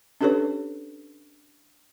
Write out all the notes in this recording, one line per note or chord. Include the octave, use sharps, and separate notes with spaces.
C#4 D4 G4 A4 B4 C#5